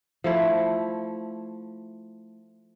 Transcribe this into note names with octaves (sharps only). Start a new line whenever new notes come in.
F3 A3 E4